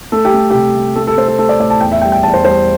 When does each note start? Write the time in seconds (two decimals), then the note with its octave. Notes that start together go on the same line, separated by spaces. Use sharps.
0.12 A3 A4
0.25 G4
0.34 A3
0.50 C3 G4
0.75 A3
0.96 A3 A4
1.07 A4
1.17 A3 C5
1.28 A4
1.38 A3 A4
1.49 D5
1.59 A2 D5
1.70 A5
1.81 E2 G5
1.92 E5
2.02 G3 G5
2.12 G5
2.23 E2 A5
2.34 C5
2.44 G3 C5